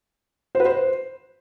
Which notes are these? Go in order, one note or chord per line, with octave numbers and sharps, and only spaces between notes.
C5
B4
C5